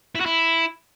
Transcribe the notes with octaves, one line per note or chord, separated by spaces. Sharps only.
E4
F#4
E4